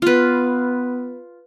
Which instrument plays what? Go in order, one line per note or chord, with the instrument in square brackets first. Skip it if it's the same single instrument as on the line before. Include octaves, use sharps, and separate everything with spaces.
[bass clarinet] B3 [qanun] F4 B4